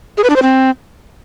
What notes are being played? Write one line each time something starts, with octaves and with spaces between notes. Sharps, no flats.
G#4
B4
D4
C5
C4